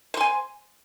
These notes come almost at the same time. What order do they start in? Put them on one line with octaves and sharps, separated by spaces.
C5 C6 G#5